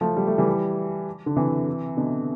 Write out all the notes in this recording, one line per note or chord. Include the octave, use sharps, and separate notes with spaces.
F3 A3
G3
A3
E3 G3
D3
C3 E3
B2 D3